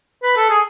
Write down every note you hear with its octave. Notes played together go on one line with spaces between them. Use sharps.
B4
A4
G#4